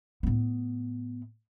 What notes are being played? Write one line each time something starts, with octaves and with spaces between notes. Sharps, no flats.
A2 B3